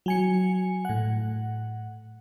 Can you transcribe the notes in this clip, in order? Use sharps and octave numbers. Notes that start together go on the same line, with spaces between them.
F#3 G#5 C#7
A2 F#5